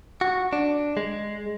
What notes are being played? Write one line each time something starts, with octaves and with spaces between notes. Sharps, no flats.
F#4
D4
G#3